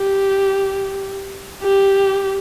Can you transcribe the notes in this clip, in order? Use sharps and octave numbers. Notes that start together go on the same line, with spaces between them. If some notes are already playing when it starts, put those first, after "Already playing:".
Already playing: G4
G4